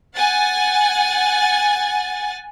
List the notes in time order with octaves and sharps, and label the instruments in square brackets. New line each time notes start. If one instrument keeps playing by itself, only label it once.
[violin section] F#5 G#5 A6